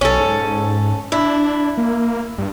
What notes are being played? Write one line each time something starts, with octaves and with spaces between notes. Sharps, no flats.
B1 C#4 A4
G#2
D4 E4
A#3
G2